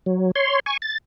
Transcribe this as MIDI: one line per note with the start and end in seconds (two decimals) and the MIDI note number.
0.06 0.31 54
0.36 0.60 73
0.36 0.60 84
0.66 0.77 80
0.66 0.77 85
0.82 0.98 93